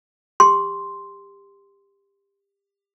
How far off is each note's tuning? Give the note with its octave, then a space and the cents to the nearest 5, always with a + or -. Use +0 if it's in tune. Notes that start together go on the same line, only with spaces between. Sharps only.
G4 +25 C6 +0